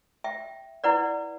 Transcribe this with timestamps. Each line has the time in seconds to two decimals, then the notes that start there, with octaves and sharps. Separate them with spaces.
0.24 E5 G5
0.84 E4 B4 D5 F#5